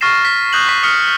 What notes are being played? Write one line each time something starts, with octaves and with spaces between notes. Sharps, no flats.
C#6 F6 A6 A#6 C7 E7
B6
D#6 F#6 G6 A#6 E7 F#7
C#6 B6
D#6 F6 B6 C#7
B6 F#7